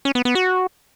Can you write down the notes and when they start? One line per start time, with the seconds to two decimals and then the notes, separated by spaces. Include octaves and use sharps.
0.05 C#4
0.15 B3
0.25 B3
0.35 F#4